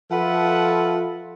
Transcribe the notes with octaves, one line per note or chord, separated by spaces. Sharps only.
F3 F4 A4 B4 E5 F#5